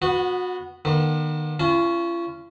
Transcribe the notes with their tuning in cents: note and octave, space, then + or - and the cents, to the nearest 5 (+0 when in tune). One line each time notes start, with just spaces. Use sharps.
B3 +0 F#4 -30
D#3 -35 B3 -45
C#4 +0 F4 -40 A5 -40